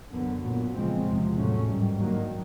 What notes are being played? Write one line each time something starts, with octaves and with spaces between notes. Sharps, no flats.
F#2 D3 F#3 B3
A#2 F#3 B3
C#3 F3 G#3 C4
E2 C3 F3 G#3
A2 F#3 A3 C#4
G#2 D#3 G3
G2 D#3 F#3 A#3